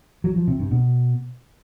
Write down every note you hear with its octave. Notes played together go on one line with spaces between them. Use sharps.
F#3
F3
C3
G2
B2